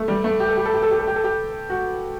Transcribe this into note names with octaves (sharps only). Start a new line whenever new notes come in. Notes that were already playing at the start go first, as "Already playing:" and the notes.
Already playing: A3
G3
A3
G4
A4
G4
A4
G4
A4
G4
A4
G4
A4
G4
F#4